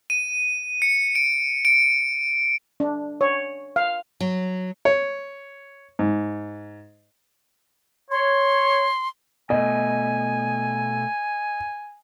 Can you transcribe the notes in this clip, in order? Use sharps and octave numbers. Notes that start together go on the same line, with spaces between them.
D#7
C#7
D7
D7
D4
C#5
F5
F#3
C#5
G#2
C#5 C6
B2 A3 D#5 G#5